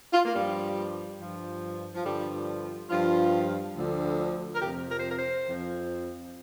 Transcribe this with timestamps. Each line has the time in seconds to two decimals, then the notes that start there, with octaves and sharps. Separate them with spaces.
0.13 F4
0.25 A#3
0.34 G2 F3 G3
1.19 G2 F3
1.94 F3
2.05 G2 D3 F3 G3
2.90 G2 F3 F4
3.75 D2 D3 F3
4.55 A#4
4.62 F2 C3 F3 G4
4.90 A#4
4.99 C5
5.09 A#4
5.19 C5
5.46 F2 F3